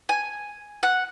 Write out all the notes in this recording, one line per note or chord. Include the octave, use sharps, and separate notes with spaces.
G#5
F#5